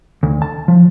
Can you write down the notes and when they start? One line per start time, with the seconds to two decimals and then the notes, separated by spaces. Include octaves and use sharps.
0.23 D2
0.42 A5
0.68 F3